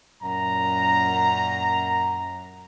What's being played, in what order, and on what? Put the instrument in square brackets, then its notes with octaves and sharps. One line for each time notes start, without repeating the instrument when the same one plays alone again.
[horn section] F#2 A#2 A#5